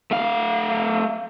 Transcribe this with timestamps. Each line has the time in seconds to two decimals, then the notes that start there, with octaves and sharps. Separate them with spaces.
0.11 A3 F5